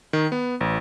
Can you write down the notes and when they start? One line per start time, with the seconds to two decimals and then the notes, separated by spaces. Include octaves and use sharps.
0.13 D#3
0.32 B3
0.61 A1